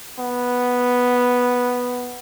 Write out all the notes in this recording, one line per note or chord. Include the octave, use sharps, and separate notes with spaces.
B3